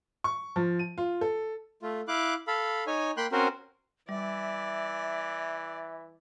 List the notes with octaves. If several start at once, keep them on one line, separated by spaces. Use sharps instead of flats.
C#6
F3
D#7
F4
A4
A3 F4
E4 F5 D6 F#6
A4 F5 B5
D#4 C#5 G#5
A#3 G5 B5 C6 F#6
C4 C#4 F#4 A#4 C5
E3 G3 D5 E5